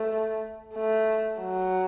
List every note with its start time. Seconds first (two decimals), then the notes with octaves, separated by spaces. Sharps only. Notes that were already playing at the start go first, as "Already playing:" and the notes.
Already playing: A3
0.74 A3
1.41 F#3